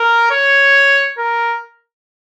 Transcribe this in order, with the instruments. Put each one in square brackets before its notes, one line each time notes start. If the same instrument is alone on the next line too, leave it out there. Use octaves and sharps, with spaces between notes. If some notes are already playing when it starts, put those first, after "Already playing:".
Already playing: [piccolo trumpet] A#4
C#5
A#4